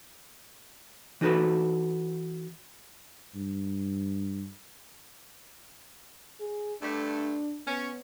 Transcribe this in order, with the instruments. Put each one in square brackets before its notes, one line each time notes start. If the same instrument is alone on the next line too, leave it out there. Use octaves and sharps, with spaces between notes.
[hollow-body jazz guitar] E3 D#4 F#4 A4 B4
[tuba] G2
[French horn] G#4
[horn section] G2 D3 A3 [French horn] D4
[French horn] B3 [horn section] C#4